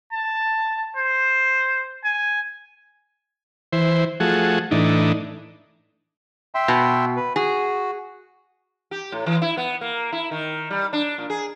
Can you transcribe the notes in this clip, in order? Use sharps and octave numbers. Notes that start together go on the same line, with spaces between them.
A5
C5
G#5
E3 C5
F3 A3 F#4 G#4
A2 E3 D4 D#4
E5 G5 C6
B2
B4
F#4 G#4
G4
A2
E3
E4
B3
A#3
E4
D#3
G3
D4
A#2
G#4